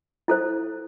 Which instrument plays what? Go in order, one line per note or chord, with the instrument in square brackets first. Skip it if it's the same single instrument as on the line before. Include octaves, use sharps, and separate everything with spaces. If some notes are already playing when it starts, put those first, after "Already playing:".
[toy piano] E4 A4 C5